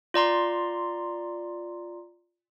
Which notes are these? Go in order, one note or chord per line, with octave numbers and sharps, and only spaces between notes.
F4 D5 A#5 C6